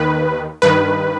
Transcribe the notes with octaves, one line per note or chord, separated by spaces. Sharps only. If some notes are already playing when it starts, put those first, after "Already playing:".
Already playing: D#2 D#3 B4
G2 D#3 B4